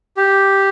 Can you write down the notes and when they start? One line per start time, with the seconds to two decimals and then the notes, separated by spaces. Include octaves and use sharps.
0.17 G4